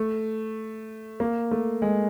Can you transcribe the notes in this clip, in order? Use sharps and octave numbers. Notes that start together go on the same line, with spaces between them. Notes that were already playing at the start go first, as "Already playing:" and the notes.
Already playing: A3
A#3
A3
G#3